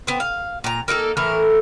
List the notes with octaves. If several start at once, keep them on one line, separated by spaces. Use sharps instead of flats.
B3 C4
F5
A#2 A#5
A#3 D#4 F#4 A4
A2 E3 A#4